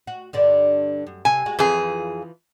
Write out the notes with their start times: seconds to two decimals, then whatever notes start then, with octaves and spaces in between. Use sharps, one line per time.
0.07 F#4
0.33 G2 D3 D4
1.07 F#2
1.25 C3 G#5
1.46 G#3 F#4
1.59 F2 E3 F3 G#4